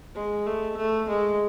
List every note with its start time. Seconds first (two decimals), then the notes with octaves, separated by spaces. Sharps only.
0.15 G#3
0.46 A3
0.77 A3
1.08 G#3